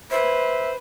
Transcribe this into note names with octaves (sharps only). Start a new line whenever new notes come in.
B4 C5 E5